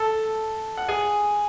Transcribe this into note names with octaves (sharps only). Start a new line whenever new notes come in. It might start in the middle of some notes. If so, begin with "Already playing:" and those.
Already playing: A4 A5
F#5
G#4 G#5